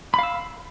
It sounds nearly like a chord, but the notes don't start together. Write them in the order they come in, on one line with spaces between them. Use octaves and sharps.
B5 F5 E6